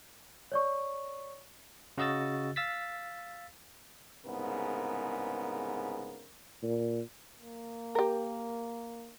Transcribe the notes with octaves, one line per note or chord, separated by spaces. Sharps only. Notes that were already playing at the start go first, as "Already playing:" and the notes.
C#5 D5 C#6
C#3 F#4 D#5 E6 A6
F5 E6 A6 B6
C2 G#2 C#3 B3 A#4
A#2
A#3
G4 A#4